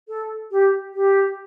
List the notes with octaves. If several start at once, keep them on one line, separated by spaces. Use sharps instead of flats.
A4
G4
G4